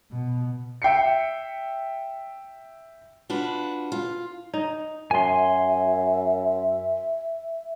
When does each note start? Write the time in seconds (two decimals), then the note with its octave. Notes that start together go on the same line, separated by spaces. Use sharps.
0.11 B2
0.82 E5 G5 C7 C#7
3.30 D4 F4 F#4 B4
3.92 F4
4.54 D#4
5.11 F#2 E5 G#5 C6